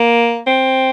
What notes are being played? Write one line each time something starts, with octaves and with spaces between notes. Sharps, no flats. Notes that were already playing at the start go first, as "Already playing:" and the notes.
Already playing: A#3
C4